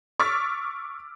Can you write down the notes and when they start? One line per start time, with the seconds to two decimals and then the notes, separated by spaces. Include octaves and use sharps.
0.20 C#6 D6 E6 F6 A6 B6